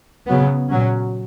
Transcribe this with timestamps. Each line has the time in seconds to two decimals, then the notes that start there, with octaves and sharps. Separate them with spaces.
0.27 C#3 F#3 B3
0.68 A#2 F#3 C#4